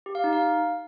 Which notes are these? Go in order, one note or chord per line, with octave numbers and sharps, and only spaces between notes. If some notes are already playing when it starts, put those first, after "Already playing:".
G4
F5
D#4
F5